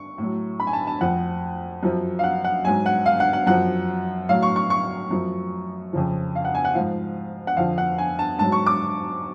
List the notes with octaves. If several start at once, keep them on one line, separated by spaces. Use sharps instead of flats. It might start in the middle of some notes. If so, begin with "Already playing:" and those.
Already playing: C#6
A2 F#3
B5
G#5
A5
A5
F2 F3 F#5
F#2 F3
F5
F#5
F#5
G#2 F#3 G#5
F#5
F5
F#5
F#5
F#2 F3 F#5
A2 F#3 F5
C#6
C#6
C#6
F#2 F3
F2 C#3 F3
F5
F#5
G#5
F#5
G#2 F3 F5
F#5
F2 D3 F3 F5
F#5
G#5
A5
G#2 F#3 A5
C#6
D6